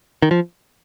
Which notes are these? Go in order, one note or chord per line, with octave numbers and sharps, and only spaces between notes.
D#3
F3